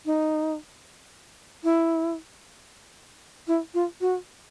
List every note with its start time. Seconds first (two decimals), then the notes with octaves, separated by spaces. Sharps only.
0.06 D#4
1.64 E4
3.48 E4
3.74 F4
4.01 F#4